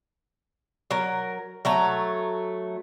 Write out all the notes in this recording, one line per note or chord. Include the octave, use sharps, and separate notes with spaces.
F#3 A#4
F#3 A3 A#5